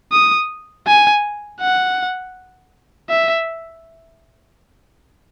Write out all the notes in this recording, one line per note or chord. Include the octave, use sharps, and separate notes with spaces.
D#6
G#5
F#5
E5